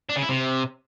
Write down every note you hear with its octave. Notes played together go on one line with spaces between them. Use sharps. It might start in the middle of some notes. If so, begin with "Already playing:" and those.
D4
C#3
E4
C3